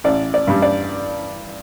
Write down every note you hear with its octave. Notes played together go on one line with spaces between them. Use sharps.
A1 D5
D5
G2 G3
D5